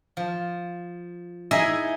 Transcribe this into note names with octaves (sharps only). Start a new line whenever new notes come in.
F3
D#4 E4 G#4 D#5 E5